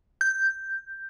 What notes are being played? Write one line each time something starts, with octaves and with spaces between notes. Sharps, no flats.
G6